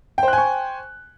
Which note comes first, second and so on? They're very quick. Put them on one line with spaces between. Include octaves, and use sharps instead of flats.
G5 C5 F#6 G#5 C#6